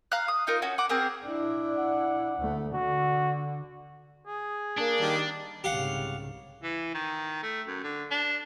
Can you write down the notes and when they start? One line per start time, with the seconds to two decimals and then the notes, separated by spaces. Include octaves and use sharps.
0.12 F5 A#5 F6 F#6
0.28 D#6
0.47 D#4 F4 A#4
0.62 C#4 F#4
0.78 F#5 D6
0.89 C4 G#4 A#4
1.26 D4 E4
1.78 F#5
2.39 D2 A3
2.74 D3 F#4
4.27 G#4
4.78 A#3 D4
5.00 D#3 G3
5.64 C2 G#2 C#3 G4 F5 F#5
6.63 E3
6.94 D#3
7.43 A3
7.67 F#2
7.83 D3
8.11 D4